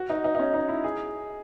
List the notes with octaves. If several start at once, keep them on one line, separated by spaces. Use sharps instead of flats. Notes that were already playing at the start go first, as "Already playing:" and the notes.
Already playing: F#4
D#4
D#4
D#4
C#4
D#4
E4
G#4